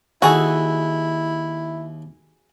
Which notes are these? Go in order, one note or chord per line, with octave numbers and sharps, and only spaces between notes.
D#2 E4 F#4 G#4 A4 D#6